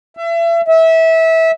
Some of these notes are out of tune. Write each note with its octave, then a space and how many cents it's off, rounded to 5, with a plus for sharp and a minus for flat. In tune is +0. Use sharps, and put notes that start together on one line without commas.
E5 +35
E5 -20